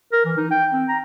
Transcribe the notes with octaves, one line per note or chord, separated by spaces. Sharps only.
A#4
E3
D#4
G5
C4
A#5